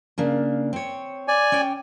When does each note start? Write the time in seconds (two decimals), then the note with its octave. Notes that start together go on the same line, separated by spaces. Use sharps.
0.18 C#3 A#3 D4
0.73 C4 C#5
1.28 D5 G#5
1.52 C#4 C#5 G5